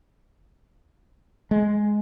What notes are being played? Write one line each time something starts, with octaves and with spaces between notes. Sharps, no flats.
G#3